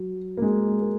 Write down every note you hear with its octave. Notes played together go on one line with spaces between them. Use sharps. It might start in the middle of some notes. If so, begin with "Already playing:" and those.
Already playing: F#3
A#3
G#3
A#3